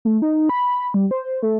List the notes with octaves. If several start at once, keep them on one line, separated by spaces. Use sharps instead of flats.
A3
D#4
B5
G3
C5
A3